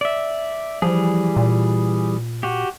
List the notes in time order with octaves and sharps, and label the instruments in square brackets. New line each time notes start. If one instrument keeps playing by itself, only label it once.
[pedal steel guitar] D5 E5
[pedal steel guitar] E3 G3 G#4 [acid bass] F3
[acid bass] A#2
[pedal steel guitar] F#4 G4